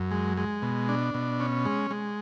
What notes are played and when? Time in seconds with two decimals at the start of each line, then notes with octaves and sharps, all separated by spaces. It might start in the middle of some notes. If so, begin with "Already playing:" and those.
Already playing: F#2
0.11 G#3
0.37 G#3
0.62 B2
0.89 D4
1.14 B2
1.40 C#4
1.65 G#3
1.91 G#3